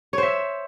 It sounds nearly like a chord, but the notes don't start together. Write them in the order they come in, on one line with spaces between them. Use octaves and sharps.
C#5 C5 E5